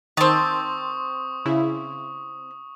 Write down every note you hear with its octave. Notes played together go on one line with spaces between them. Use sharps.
D#3 C4 A5 C#6 D#6
C#3 E4